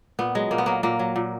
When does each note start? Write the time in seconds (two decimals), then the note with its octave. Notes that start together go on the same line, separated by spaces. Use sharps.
0.19 A#2 B3
0.35 F#3 G#3
0.51 A#2 A#3
0.58 B3
0.66 F#3 A#3
0.83 A#2 A#3
0.99 F#3
1.16 A#2